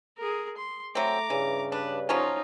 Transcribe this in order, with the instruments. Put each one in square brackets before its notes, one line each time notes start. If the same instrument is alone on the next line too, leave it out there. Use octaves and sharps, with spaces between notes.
[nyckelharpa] G#4 A#4
C6
[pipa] F#3 C4 [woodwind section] A3 [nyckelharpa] A#5 D6
[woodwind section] G2 C#3 [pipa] E3
[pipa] D4 [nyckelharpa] B4
[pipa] F3 F#3 C#4 [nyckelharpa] D#4 F4